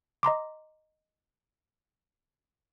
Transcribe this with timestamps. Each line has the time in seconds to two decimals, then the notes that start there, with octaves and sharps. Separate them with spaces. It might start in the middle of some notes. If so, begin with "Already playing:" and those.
0.23 D#5 A#5 C6 D6